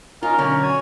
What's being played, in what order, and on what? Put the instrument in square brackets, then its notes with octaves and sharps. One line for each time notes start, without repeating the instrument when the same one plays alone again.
[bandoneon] C#4 D#4 [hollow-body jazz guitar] F4 [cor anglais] A#4
[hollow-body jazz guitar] B1 D3 C#4 [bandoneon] D5 C#6
[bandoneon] F#4 C#5 [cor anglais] G#5